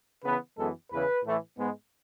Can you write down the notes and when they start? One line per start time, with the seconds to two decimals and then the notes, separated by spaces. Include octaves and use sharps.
0.24 C#3 E3 B3 B4
0.57 F#2 E3 G#3 B3 A4
0.90 E2 C#3 E3 B4
1.24 A2 E3 A3
1.57 G#2 G#3 B3